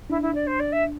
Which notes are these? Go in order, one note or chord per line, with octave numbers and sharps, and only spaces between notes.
D4 E4
E4
D5
C5
D5
E5